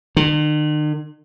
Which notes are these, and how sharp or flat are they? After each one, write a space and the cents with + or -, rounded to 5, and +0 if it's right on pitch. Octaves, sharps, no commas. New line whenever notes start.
D#3 -45